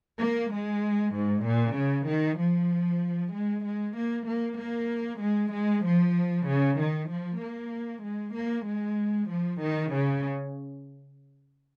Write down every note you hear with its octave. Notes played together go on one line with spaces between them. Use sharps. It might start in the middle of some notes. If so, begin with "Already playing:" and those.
A#3
G#3
G#2
A#2
C#3
D#3
F3
G#3
G#3
A#3
A#3
A#3
G#3
G#3
F3
C#3
D#3
F3
A#3
G#3
A#3
G#3
F3
D#3
C#3